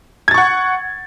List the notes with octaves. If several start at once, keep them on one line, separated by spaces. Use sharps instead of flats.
F#5 C#6 G#6 A6